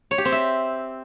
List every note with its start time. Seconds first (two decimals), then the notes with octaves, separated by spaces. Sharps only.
0.11 C#5
0.18 G4
0.25 C4
0.32 E5